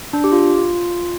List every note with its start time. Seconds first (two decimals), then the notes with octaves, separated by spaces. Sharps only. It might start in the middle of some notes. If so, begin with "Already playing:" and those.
0.13 D4
0.24 G4
0.32 F4